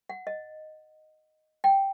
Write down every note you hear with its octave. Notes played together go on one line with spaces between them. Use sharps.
F#5
D#5
G5